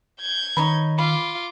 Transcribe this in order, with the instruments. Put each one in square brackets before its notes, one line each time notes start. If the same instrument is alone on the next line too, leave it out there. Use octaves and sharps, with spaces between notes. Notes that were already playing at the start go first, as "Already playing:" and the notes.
[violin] G6 G#6
[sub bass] D#3 [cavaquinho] D#4 C#5 B5
[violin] F4 D6 [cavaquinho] B5